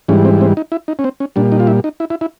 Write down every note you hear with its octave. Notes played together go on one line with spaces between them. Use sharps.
G#2 E3 G3 C#4
C4
C4
D#4
E4
D#4
C#4
C4
C#4
A#2 G3 D4
D#4
F4
E4
D#4
E4
E4
E4